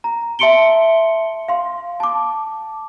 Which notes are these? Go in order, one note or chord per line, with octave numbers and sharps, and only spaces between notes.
A#5
E5 A5 C6 C#7 D7 G7
F5 C6
A5 D6